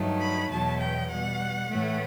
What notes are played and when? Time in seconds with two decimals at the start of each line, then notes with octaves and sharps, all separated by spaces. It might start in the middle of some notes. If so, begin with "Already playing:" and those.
Already playing: G2 D#3 F#3 A3
0.20 B5
0.49 E2 B2 F#3 A5
0.79 G5
1.09 B2 G3 F#5
1.69 A2 E3 A3